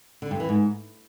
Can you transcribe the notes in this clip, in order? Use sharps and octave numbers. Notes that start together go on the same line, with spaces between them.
D3
G2
E3
G#2